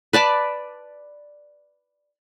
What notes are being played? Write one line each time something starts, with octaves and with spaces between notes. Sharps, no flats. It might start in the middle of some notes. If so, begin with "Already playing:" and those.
B4 D5 A5 D6